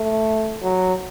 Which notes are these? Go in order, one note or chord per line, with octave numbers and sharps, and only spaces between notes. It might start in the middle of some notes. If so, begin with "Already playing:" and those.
Already playing: A3
F#3